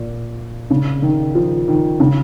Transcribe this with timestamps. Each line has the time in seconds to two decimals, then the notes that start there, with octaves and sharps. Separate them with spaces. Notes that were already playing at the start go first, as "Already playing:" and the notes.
Already playing: A#2
0.70 C#3
1.02 D#3
1.35 F3
1.68 D#3
2.00 C#3